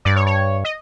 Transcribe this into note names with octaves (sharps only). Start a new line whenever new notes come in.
G2 D5
C#5
C#5
D#5